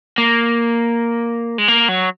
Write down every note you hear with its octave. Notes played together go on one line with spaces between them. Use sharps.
A#3
G#3
A#3
F#3